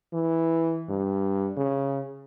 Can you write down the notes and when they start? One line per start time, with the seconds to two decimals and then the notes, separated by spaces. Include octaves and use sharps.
0.13 E3
0.89 G2
1.57 C#3